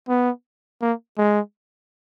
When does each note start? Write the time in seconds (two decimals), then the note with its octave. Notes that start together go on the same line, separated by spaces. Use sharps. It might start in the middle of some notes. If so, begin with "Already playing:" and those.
0.09 B3
0.82 A#3
1.18 G#3